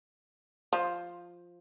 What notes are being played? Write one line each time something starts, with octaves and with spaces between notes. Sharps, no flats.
F3